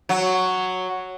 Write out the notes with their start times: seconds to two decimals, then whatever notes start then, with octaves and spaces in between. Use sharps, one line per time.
0.09 F#3